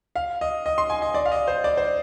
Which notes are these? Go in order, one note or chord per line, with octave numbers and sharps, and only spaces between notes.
F5
D#5
D#5
C6
G#5
D#5
D5
F5
D#5
C5
D5
C5